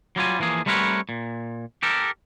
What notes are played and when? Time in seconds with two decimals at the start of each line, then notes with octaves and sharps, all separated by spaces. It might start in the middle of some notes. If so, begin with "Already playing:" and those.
0.16 F#3 G3 F4 G#5
0.40 E3 F3 A#3 G#4
0.66 G3 A3 C4 A#4 B4 C#5
1.09 A#2
1.83 G4 A4 A#4